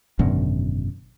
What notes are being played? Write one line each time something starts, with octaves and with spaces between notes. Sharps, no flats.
G#1 F#2 B2 D3